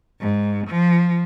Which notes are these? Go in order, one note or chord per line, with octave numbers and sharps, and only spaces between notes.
G#2
F3